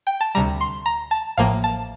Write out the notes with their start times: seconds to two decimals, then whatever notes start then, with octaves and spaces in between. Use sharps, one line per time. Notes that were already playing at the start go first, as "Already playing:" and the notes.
0.07 G5
0.21 A5
0.35 D2 C3 G3 A#5
0.61 C6
0.86 A#5
1.11 A5
1.37 A1 A2 F3 A#3 F5
1.64 A5